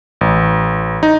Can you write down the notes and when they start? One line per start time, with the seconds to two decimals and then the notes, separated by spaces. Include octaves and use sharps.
0.21 A1
1.03 D#4